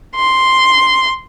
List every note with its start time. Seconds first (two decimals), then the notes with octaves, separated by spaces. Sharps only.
0.16 C6